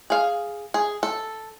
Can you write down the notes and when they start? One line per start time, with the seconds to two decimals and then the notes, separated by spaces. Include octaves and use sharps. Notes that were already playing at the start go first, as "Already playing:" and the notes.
0.10 G#4 F5
0.74 G#4
1.03 A4